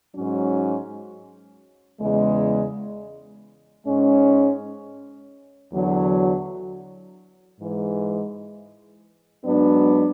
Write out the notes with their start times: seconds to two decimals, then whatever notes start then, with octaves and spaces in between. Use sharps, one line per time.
0.14 G#2 F#3 C#4
2.00 E2 C#3 G#3
3.86 G#2 G#3 C#4
5.73 E2 D3 F#3
7.59 G#2 E3 G#3
9.45 G#2 F#3 B3 D4